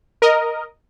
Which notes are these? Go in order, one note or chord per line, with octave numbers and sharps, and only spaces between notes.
A#4 D#5